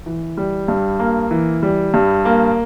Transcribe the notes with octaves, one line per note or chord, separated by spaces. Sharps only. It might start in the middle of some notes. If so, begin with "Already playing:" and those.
E3
G3
G2
A#3
E3
G3
G2
A#3